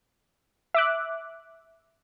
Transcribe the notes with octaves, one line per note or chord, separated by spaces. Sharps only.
E5 D6 F#6